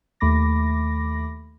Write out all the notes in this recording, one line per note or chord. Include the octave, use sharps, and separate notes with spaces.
D#2 A3 B5 D6 A#6